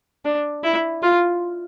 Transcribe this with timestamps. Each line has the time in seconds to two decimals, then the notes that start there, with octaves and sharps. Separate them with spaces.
0.25 D4
0.64 E4
1.02 F4